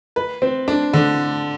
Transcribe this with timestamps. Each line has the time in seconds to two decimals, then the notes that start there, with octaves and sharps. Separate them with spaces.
0.16 B4
0.42 C4
0.68 D4
0.93 D3